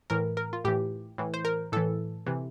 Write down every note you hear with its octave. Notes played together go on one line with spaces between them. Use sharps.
A2 E3 A#4
A#4
F4
A2 E3 G4
A2 E3
C5
A#4
A2 E3 A4
C3 E3